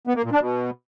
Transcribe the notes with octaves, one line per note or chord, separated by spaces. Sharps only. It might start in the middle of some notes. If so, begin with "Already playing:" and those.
B3
A#3
A#2
D4
B2